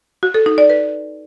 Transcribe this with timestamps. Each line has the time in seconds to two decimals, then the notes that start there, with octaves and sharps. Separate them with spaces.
0.23 F#4
0.34 A4
0.46 D#4
0.58 D5
0.70 B4